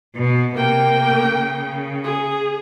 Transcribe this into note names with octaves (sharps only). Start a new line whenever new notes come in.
B2
C3 A#3 G5
C#3
G#4